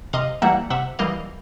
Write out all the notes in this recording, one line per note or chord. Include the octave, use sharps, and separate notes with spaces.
C3 D#5 F5
E3 G3 A#3 E5 F#5
C3 E5 F#5
E3 G3 A#3 D#5 F5